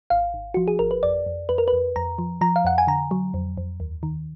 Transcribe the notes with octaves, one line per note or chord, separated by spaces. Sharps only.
G#1 F5
G#1
F3 F#4
G#4
G#1 A#4
B4
F2 D5
F2
F2 B4
A#4
B4
F2
F2 A#5
F3
F3 A#5
F5
F2 F#5
G#5
D3 A#5
F#3
F2
F2
D#2
D#3